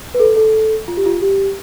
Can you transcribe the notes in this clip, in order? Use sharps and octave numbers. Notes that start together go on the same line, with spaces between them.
B4
A4
A4
F4
G4
F4
G4